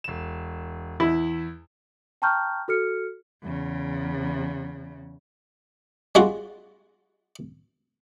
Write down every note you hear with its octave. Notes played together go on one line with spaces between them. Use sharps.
E1 E7
E2 E4
G5 A5 A#5 C#6 F6 G6
F#4 A4 F6 C#7
E2 C#3
G3 G#3 F4 F#4